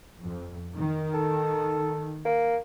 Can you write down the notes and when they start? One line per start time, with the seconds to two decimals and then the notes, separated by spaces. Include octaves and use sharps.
0.22 F2
0.74 D#3
1.14 A4
2.25 A#3